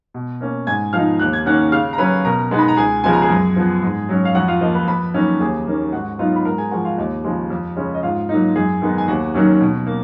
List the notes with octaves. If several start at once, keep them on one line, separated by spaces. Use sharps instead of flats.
B2
A#3 C#4
G#2 G#5 G#6
F3 B3 D#4 F5 F6
D#2 F#6
G#6
D#3 A#3 C#4 F#5 F#6
C#3 F5 F6
A#5
F#3 C#4 B4 B5
B2 A#4 A#5
G#3 B3 D#4
B5
A#5
C#2 G#4 G#5
C#3 F3 G#3 B3 G#5
A#5
G#4 G#5
F#2
F3 B3
G#2
F#3 C#4
F5
F2 F#4 F#5
F4 F5
F3 A#3 D#5
B4 B5
F2 B4 B5
D#3 F#3 A#3 C#4
D#2 G#4 G#5
D#3 A#3 C#4
G#2 F#4 F#5
F#3 B3 D#4 F4 F5
B5
G#2 A#4 A#5
G#4 G#5
F3 G#3 F#4 F#5
F4 F5
D#2 D#5
C#3 F3 G#3
F2
C#3 G#3 C#4
D#5
G#2 F4 F5
F#3 A#3 D#4
F#2 G#4 G#5
D#3 G#3 B3 D#4
G#5
D#2 F#4 F#5
D#3 F#3 C#4
B2
A#3